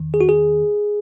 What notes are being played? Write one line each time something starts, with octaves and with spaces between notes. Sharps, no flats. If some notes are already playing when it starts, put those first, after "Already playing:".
Already playing: E2 D#3
G#4
F#4
G#4